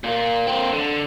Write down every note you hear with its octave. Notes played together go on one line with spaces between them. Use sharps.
A#2 A#3
A#3 C4
D3